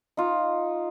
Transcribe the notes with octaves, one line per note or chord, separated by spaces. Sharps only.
D#4 F4